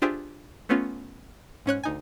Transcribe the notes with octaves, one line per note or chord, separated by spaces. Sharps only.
D4 F4 G4 G#4 C5 E5
A3 B3 C#4 F4
G#2 C#4 C#5 F#6
D2 D#4 G#5